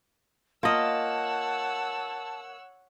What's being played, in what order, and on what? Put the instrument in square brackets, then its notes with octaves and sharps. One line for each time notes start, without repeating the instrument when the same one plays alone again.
[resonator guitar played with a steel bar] A#3 [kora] F4 D#5 [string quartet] C#5 F#5 E6 [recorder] A5